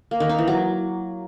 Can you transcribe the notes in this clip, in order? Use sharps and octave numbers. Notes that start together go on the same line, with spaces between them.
A#3
D#3
D#4
E3
F#3